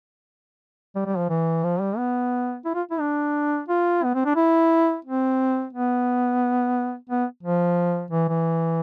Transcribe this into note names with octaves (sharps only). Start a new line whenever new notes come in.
G3
G3
F3
E3
F3
G3
B3
E4
F4
E4
D4
F4
B3
C4
D4
E4
C4
B3
B3
F3
E3
E3